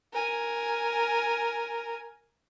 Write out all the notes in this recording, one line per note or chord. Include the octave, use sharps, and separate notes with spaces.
A#4 G#5